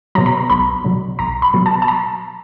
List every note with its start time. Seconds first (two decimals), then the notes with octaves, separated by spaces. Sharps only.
0.15 B2 F#3 A#5
0.26 B5
0.37 A#5
0.50 B1 B5
0.84 B2 F#3
1.19 B1 A#5
1.42 B5
1.54 B2 F#3
1.66 A5
1.82 A5
1.88 A#5